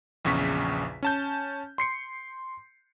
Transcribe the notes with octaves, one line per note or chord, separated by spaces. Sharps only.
A#1 E2 C#3 C#6 B6
C#4 A5 G6
C6 C7 C#7